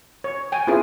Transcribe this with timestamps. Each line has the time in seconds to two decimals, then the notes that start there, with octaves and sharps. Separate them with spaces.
0.24 C#5
0.52 G5 G#5
0.67 B3 C#4 E4 F4 G#4